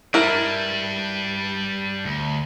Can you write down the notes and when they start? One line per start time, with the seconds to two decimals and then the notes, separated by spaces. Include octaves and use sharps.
0.14 G3 D4 E4 A#4
2.05 D2